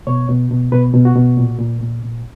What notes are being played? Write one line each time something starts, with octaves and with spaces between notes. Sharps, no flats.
B2 C#5
B2
B2
B2 B4
B2
F#4
B2
A#2
A#2
A#2
A#2